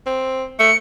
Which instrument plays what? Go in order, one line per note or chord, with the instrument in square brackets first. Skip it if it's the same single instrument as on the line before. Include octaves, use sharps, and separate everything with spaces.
[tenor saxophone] C4
[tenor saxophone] A3 [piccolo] C#7